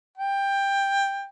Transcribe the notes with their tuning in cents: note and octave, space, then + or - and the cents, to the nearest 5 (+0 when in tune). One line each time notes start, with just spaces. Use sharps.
G5 +15